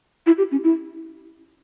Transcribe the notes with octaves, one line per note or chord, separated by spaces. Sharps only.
E4
G4
C#4
E4